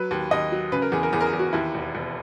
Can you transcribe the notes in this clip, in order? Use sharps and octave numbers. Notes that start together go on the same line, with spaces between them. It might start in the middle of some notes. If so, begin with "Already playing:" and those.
Already playing: F#3 B4
D#2
D#2 D#5
F#3
C#3 B4
A#4
E2 G#4
A#4
E2 G#4
A#4
G#4
E2
F#4
D#2 E4
E1
E1